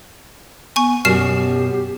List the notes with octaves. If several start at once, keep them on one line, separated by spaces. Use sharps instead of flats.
B3 G#5 C#6
F#2 B2 G4 F6 C7 E7